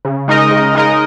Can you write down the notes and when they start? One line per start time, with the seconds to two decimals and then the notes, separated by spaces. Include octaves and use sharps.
0.05 C#3
0.28 G#3 D#4 A#4 D#5
0.51 C#3
0.75 G#3 D#4 A#4 D#5